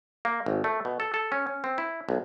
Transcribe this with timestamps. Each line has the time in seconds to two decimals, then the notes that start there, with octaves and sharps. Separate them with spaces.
0.25 A#3
0.46 G#1
0.64 A3
0.85 B2
1.00 A4
1.14 A4
1.32 C#4
1.47 C#4
1.64 C4
1.78 E4
2.09 B1